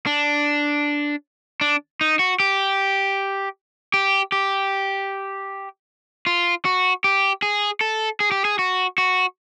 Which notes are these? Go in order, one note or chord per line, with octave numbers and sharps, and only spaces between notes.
D4
D4
D#4
F#4
G4
G4
G4
F4
F#4
G4
G#4
A4
G#4
G4
G#4
F#4
F#4